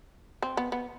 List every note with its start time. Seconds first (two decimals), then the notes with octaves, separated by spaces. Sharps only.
0.42 C4
0.57 B3
0.72 B3